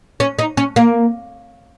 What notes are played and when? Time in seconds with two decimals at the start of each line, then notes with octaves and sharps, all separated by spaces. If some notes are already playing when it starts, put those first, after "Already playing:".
0.20 C#4
0.39 D#4
0.57 C#4
0.76 A#3